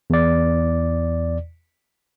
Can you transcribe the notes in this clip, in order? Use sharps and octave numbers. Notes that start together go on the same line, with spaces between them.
E2 D5